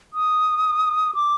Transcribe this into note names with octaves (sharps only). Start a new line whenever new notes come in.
D#6
D6